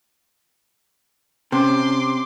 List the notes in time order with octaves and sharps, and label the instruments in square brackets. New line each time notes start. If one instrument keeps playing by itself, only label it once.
[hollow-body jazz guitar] C3 [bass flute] C#4 [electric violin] C6 D6